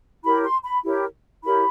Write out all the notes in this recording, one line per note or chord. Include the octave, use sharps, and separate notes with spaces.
E4 G4 A#4 C#5 B5
C6
B5
E4 G4 A#4 C#5
E4 G4 A#4 C#5 B5